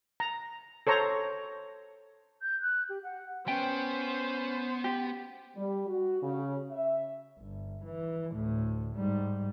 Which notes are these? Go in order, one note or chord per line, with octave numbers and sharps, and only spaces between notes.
A#5
A4 C5 C#5 A#5
G6
F#6
G4
F#5
B3 C#4 C5 G5
G4
G3
F#4
C#3
E5
G1
E3
D2 A2
G#2 G3